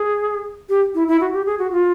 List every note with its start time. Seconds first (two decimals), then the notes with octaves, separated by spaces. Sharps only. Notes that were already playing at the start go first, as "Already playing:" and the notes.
Already playing: G#4
0.69 G4
0.95 E4
1.08 E4
1.21 F#4
1.33 G4
1.46 G#4
1.59 F#4
1.72 F4